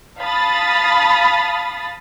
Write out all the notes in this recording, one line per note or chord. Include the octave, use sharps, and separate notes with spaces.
F5 A5 B5 D#6 A6